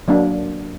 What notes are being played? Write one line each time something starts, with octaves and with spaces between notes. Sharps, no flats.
F#3 A#3 D4